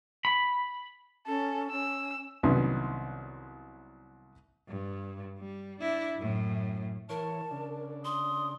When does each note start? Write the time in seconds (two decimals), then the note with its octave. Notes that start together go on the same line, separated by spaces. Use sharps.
0.25 B5
1.27 C#4 A4
1.71 C#4 E6
2.43 C2 D#3 F#3 B3 C#4 C6
4.68 G2
5.39 G3
5.80 D4 E4
6.17 F#2 A2
7.09 E3 A#4 C#5 A5
7.51 C#3 D4
8.05 C6 D#6